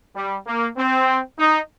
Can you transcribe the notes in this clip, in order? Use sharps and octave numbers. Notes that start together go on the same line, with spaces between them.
G3
A#3
C4
D#4